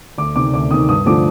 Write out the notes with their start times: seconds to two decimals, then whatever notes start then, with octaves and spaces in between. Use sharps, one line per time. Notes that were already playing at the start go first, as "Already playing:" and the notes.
0.18 D2 D6
0.36 C3 D#3 D6
0.53 D2 D6
0.71 C3 D#3 D#6
0.89 G2 D#6
1.06 D3 F3 A3 D6